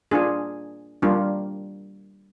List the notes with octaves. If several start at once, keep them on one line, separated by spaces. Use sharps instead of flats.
A#3 D4 F4 G#4
G3 A#3 D4 F4